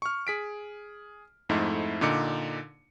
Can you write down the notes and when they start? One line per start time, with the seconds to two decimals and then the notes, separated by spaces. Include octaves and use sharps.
0.02 C#6 F6
0.27 G#4 B6 D7
1.49 F2 G#2 A3 D#4 E4
2.01 A#2 D3 D#4 D6 C#7